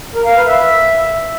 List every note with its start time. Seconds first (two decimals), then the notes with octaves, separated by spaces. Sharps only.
0.15 A#4
0.25 F5
0.36 B4
0.47 E5